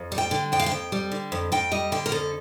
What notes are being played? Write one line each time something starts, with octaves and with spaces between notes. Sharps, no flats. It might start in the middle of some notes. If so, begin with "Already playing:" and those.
Already playing: F2
G3
G5
D3
F2 G5
F5
G5
F2
G3
D3
F2
F2 G5
G3 D#5
D3 G5
A#4
F2 A4